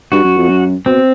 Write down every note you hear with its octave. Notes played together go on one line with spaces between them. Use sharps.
G2 F#4
F#2
F2
F#2
B2 C4